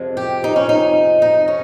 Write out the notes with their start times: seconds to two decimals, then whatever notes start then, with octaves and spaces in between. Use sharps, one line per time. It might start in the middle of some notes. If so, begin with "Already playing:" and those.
Already playing: F2 C3 F3 G#3
0.17 G4
0.44 D#4
0.56 C#4
0.69 D#4
1.22 D#4
1.48 C#4